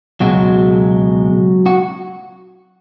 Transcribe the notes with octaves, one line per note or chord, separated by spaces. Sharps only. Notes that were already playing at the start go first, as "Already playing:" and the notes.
C#2 B2 F#3 G#3 F#4
F#4